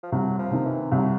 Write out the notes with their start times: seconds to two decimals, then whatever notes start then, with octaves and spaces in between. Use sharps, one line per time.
0.03 F3
0.12 C2 F#3
0.39 F3
0.51 C3 D#3
0.66 E3
0.91 C2 F#3